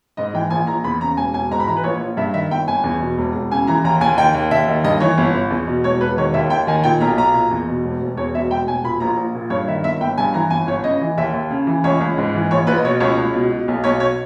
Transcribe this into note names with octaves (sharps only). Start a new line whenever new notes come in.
G#2 D#5
E3 G5
A#1 G#5
A#1 A#5
E2 B5
C#3 A#5
E1 G#5
E1 G#5
G#2 A#5
B5
E3 A#5
B4
A#1 C#5
A#1
G2 E5
D#3 E5
G1 G5
G1 G#5
E2
B2
E1
E1
C#3 G#5
E3 A#5
D#2 A#5
D#2 G#5
D#3 G5
D#2
D#2 E5
D#3
G2 D#5
E3 C#5
G1
G1
E2
B2
E1 C#5
E1 B4
D#3 C#5
D#2 E5
D#2 G5
D#3 G#5
A#2 G5
B1 A#5
B1 A#5
A#2
E2
B2
E1
E1
E2 C#5
B2 E5
E1 G5
E1 G#5
A#2 B5
A#1 A#5
A#1
A#2
G2 C#5
D#3 E5
G1 E5
G1 G5
G2 G#5
E3 A#5
G1 G#5
G1 C#5
C#3 D#5
E3
D#2 E5
D#2
C#3
E3
C#2 C#5
C#2
G#2
E3
A#1 C#5
A#1 B4
D#5
B2 C#5
C#2 C#5
C#2
B2
B2
B1
B1 C#5
B2 C#5